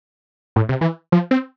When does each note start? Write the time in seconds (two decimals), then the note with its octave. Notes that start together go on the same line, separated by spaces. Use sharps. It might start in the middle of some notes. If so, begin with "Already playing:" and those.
0.56 A2
0.69 C3
0.81 E3
1.12 F3
1.31 C4